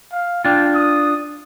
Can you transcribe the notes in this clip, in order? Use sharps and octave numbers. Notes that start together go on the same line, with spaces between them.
F5
D4 F4 G5
D#6